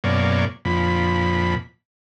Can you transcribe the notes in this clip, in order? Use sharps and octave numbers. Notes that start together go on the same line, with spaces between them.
F#2 B2 A#3 C#5 D5
F2 A#2 B5